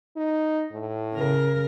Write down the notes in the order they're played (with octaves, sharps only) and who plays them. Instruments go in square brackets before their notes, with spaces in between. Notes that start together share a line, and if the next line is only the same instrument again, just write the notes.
[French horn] D#4
A2
[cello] C#3 A#4